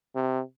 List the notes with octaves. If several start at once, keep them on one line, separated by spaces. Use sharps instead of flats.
C3